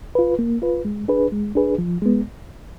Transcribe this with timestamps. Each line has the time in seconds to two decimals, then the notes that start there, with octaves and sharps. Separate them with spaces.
0.15 F4 B4
0.39 A#3
0.62 F4 B4
0.85 G#3
1.08 D4 G#4 B4
1.32 G#3
1.55 D4 G#4 B4
1.78 F3
2.02 G#3 B3